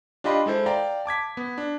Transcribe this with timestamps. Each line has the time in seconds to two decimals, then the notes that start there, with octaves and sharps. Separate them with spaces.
0.24 D4 F4 G4 D#5 B5 C6
0.46 G#3 E4 A4 C5
0.66 D5 F5 G5 A#5
1.06 A5 D6 G#6 B6
1.37 B3
1.58 D4